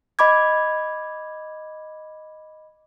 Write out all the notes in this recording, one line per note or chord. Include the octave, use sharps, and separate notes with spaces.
D#5 B5 D6 G#6